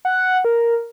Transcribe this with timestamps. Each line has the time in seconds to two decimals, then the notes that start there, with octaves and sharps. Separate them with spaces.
0.05 F#5
0.45 A#4